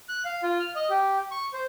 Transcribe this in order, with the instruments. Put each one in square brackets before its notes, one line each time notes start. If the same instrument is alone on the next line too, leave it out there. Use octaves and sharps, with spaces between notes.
[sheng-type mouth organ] F#6
F5
F4
F6
D#5
G4
C#6
C5